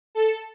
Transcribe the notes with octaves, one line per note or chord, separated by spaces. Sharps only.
A4